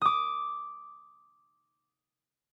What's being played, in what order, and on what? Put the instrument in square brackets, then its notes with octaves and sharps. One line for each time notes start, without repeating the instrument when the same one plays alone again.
[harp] D6 D#6